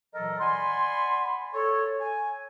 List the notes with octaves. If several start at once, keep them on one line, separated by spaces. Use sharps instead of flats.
A#2 E3 F#3 A4 A#4 D#5
D5 F#5 G#5 B5 C6
A4 C#5
G#5